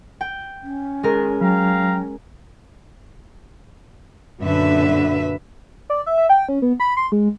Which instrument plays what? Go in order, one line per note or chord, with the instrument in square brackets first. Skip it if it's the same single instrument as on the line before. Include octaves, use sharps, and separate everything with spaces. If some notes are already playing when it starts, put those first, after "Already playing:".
[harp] G5
[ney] C#4
[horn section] D#3 [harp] G#3 A#4
[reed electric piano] F#3 [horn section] F5 G5 A#5
[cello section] F#2 A#2 D3 B4 E5
[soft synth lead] D5
E5
E5
G5
C#4
B3
B5
C6
G#3